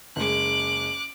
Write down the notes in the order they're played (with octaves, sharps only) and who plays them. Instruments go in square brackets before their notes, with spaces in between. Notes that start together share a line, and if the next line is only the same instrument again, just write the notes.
[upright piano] F#1 G#3 [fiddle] D6 F#6